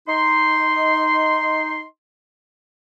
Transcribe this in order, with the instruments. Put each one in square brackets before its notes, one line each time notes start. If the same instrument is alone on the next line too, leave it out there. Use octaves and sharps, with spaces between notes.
[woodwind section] D#4 C6